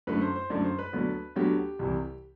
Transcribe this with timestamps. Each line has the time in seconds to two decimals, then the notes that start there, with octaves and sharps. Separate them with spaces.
0.07 F#2 D3 A3 B4
0.21 C5
0.36 C5
0.50 F#2 D3 A3 D5
0.64 C5
0.79 B4
0.93 D2 D3 F#3 B3
1.36 D2 D3 F#3 B3 G4
1.79 C2 C3 E3